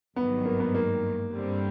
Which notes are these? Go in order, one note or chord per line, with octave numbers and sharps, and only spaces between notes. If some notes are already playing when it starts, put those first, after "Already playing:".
G#1 G2 D#3 F#3 B3
A#3
B3
A#3
G2 D3 G3 C4